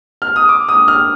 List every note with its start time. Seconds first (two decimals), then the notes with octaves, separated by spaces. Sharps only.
0.22 F6
0.36 D#6
0.49 D6
0.69 D#6
0.88 F6